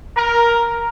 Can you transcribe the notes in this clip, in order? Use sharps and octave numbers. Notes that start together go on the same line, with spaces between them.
A#4